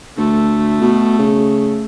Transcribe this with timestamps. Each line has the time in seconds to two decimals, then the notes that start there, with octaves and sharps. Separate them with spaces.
0.18 D2 A3
0.81 B2
1.19 C#3